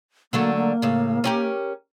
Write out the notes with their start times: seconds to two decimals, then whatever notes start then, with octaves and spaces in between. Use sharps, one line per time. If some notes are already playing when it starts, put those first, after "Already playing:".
0.33 D3 F#3 A3 A#3
0.56 A#3
0.82 A2 C#3
1.24 C#4 G4 A#4